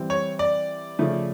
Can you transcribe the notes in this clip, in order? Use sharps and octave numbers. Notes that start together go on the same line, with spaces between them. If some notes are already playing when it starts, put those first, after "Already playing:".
Already playing: E3 G3 C4
C#5
D5
C#3 F3 A3